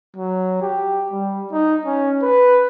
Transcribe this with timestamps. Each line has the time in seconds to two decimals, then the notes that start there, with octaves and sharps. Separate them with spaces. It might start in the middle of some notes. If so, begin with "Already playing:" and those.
0.17 F#3
0.62 G4
1.12 G3
1.52 D#4
1.86 C#4
2.23 B4